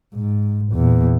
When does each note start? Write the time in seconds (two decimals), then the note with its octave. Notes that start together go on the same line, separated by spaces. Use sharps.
0.14 G#2
0.72 E2 A#2